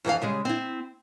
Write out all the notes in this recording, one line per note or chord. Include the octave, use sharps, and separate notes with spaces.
F2 E3 A4 F5
C#3 G3 G#3
C4 E4